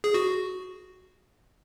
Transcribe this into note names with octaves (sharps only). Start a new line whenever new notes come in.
G#4
F#4